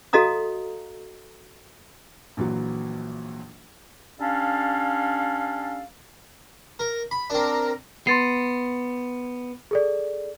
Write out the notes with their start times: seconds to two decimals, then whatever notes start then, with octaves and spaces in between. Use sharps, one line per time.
0.13 F#4 A4 D#5 F5 A#5 D#6
2.37 A#1 A#2 E3 F#3
4.19 G3 C#4 D4 A4 F5
6.79 A#4
7.11 B5
7.30 C4 D4 A#4
8.07 B3 C6 A6 C7
9.71 G#4 A4 D5